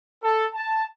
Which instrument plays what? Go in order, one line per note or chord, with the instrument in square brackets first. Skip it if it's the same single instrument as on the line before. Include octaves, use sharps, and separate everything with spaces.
[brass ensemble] A4
A5